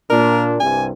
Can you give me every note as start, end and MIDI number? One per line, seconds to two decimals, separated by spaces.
0.10 0.59 46
0.10 0.62 62
0.10 0.43 70
0.60 0.90 36
0.60 0.90 43
0.60 0.90 48
0.60 0.84 80